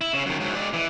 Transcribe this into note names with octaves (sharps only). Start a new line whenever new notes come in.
E4
C#3
F#2 D#3
G#2 F#3
G#3 D5
E3